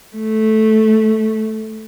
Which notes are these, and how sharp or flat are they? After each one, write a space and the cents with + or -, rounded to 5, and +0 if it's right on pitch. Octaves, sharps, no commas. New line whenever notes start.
A3 -10